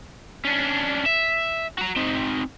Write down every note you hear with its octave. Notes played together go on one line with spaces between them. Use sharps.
C#4 D4
E5
F#4 A#5
C4 D#4